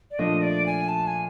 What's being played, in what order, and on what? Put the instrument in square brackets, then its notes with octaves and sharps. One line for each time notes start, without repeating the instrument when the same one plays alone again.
[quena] D5
[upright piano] A#2 F3 A3 D4 [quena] D#5
[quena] D5
G#5
A5
G#5